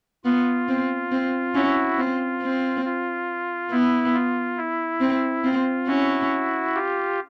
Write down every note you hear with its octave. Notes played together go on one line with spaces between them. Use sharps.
B3 F4
C4
C4
C#4 E4 F#4
C4 F4
C4
F4
B3 E4
F4
E4
C4
C4 F4
C#4 E4 F#4
F4 G4